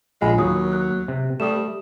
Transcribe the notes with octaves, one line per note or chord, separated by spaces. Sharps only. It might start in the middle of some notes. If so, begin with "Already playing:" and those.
A#1 G#3 F4 F5 G#5 B5
D#2 F#3 F5 D#6
F#6
C3
G3 A3 G4 D#6 E7